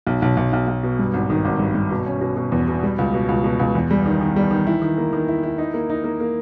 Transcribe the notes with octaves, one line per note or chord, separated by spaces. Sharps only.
B1
B1
B1
B1
B1
B2
G2
G#1
D#3
G#1
G2
G2
B2
C#4
B2
B2
E2
B2
G3
C#2
B2
C#2
B2
C#2
E2
G3
D#3
D#3
G3
D#3
E4
D#3
A#3
D#3
E4
E4
D#4
A#3
D#4
A#3
A#3